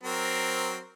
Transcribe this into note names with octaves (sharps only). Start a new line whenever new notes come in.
F#3 C4 A#4